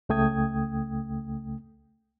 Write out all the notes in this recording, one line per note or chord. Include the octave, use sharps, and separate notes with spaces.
C#2 C#3 A3 G5 D#6 G#6